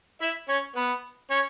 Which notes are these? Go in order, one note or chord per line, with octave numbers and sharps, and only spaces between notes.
E4 E5
C#4 C#5
B3 B4
C#4 C#5